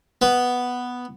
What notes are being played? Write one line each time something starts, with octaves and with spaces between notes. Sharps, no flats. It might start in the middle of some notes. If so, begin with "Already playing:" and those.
B3